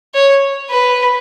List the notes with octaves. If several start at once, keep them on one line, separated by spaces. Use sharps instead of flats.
C#5
B4